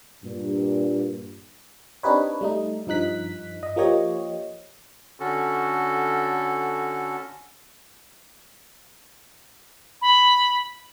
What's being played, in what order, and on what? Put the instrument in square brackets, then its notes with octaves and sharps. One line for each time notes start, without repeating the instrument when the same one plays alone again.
[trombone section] G2 A#2
[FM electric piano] C4 D4 D#4 G4 B4 C#5
G3 A3 D#4
G2 F3 D#4 F#6 B6
D#5
F3 A#3 G4 C#5 D#5
[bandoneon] D3 C#4 F#4 A4
[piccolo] B5